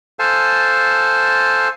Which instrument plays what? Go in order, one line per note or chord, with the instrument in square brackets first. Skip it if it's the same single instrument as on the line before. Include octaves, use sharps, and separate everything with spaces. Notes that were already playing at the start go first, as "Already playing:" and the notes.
[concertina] A4 C5 F5 G#5 A5